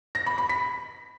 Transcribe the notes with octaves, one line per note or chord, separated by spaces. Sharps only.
A#6
B5
B5
B6